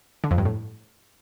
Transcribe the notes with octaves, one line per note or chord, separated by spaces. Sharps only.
D3
F2
G2
A2